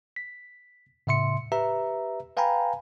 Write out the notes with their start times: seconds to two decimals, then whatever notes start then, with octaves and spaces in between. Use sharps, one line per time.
0.16 B6
1.07 A2 C#3 E5 C6 C#7
1.52 G4 B4 E5 A#5
2.37 B4 F5 G5 G#5 A#5 B5